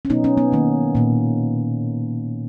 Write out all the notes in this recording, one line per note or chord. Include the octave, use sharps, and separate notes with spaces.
C#4
B2 F#3 B3 D#4
C#4
B3
D#3 A#3
A#2 A#3